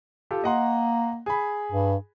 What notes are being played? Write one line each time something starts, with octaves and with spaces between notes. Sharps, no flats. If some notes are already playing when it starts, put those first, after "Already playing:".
F4 G4 A4
A#3 D#5 F#5 C6
G#4 B5
G2